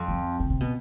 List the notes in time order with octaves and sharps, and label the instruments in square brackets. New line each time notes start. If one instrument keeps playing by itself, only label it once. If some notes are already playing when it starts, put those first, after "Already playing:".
Already playing: [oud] F2
[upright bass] F3
C#3
C3
B2